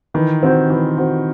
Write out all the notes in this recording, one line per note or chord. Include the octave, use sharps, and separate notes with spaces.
D#3 E3
C4 F#4 C5
E3
C4 F#4 C5